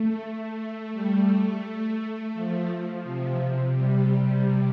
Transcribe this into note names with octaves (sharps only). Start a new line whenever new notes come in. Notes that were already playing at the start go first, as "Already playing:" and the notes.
Already playing: A3
A3
G3
A3
A3
F3
C3
G3